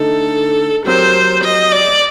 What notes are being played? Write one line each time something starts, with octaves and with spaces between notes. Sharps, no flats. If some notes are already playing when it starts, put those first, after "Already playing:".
Already playing: D3 A3 D#4 A4
F#3 C4 G4 A#4 C5
D#5
D5